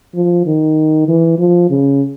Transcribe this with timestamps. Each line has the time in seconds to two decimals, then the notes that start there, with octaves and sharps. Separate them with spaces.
0.15 F3
0.46 D#3
1.08 E3
1.39 F3
1.70 C#3